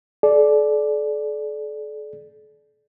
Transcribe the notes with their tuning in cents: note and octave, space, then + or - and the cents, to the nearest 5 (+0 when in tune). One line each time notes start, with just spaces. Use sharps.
A4 -40 D5 +0